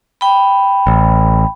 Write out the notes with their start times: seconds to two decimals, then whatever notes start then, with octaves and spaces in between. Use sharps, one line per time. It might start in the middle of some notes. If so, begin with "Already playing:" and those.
0.21 G5 B5
0.87 A1